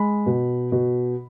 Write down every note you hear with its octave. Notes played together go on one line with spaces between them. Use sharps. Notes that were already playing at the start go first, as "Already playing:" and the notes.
Already playing: G#3 B5
B2
B2